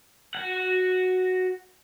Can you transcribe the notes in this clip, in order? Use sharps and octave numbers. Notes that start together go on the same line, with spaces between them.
F#4 F#5